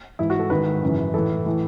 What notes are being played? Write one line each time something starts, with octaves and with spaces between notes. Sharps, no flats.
G#2 E3 E4
F#4
A4
G#2 D#3 B4
F#2 C#3 E3
A2 E3 A4
A2 E3